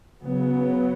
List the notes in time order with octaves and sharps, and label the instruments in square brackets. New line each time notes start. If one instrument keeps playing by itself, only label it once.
[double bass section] C#3 F#3 B3